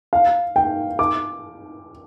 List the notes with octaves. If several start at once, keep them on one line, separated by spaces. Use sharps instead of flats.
F5
G5
D6